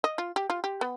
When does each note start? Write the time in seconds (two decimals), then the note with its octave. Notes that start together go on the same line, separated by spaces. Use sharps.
0.04 D#5
0.18 F4
0.36 G4
0.50 F4
0.64 G4
0.81 B3